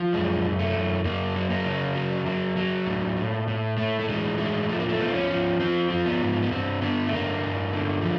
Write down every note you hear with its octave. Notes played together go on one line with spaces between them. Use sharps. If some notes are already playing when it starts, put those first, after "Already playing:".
Already playing: F3
F#2 G#3
F#2
A3
F#2
F#2 A#3
F#3
A#3
C#3
F#3
F#3
F#3
A2
A2
A2
A2 A3
A3
E3 G#3
A2 G#3
F3 A3
A#3
A3
F3 B3
C4
C#4
F3
F3 C4
F3
B3
G#2
B3
G2 C4
D3 B3
A3
G2 A#3
G2
D3
F3